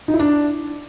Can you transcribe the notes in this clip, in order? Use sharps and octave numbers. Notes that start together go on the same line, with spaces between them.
D#4
E4
D4